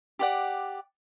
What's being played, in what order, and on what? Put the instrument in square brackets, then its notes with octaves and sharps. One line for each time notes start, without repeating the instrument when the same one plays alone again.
[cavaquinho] G4 D5 F#5